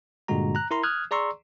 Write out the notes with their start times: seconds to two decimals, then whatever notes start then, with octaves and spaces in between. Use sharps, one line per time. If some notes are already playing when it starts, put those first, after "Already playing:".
0.28 G2 A#2 D3 G#3 F#4 A#5
0.55 A#5 F#6
0.71 E4 A#4 A#5 C6
0.83 D#6 F6 F#6 G#6
1.11 G#4 D5 A#5 C6 C#6 E6